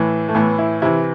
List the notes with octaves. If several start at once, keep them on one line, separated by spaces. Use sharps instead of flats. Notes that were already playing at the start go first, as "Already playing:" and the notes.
Already playing: A2 E3
A3
A2 E3 B3
E4
C3 E3 E4